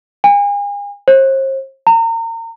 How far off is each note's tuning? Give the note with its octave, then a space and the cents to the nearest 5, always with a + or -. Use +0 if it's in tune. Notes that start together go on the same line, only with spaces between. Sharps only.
G#5 -40
C5 +40
A#5 -35